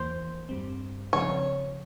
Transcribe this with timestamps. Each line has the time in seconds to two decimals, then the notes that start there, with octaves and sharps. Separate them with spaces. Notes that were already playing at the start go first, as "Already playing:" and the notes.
Already playing: E2 E3 A#3 C5
0.49 G2 G3 C4
1.13 C#3 F3 C4 C#5